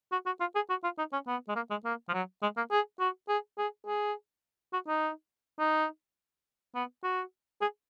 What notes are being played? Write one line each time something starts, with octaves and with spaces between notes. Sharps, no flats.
F#4
F#4
F4
G#4
F#4
F4
D#4
C#4
B3
G#3
A#3
G#3
A#3
F3
F#3
G#3
A#3
G#4
F#4
G#4
G#4
G#4
F#4
D#4
D#4
B3
F#4
G#4